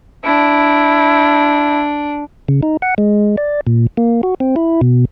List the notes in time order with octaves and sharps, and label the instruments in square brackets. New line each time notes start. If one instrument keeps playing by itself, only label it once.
[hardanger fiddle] D4 [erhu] E4
[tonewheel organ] C#3
D#4
F#5
G#3
D5
A#2
A#3
F#4
C4
E4
B2